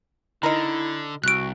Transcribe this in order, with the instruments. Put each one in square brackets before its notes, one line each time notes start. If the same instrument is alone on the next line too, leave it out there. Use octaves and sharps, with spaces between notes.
[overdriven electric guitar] D3 [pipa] D#4 A#4 [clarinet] E4
[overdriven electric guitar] C2 [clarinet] F#4 [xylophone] F#6 D7